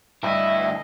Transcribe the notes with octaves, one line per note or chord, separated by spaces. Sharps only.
D2 G2 E4 D#5 E5